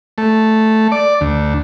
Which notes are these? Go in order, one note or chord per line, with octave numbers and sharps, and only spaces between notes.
A3
D5
D2